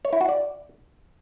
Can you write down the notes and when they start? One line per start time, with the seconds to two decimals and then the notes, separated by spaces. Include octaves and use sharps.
0.05 C#5
0.13 E4
0.21 F#4
0.29 D5